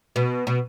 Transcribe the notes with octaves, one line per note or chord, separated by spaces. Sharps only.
B2
B2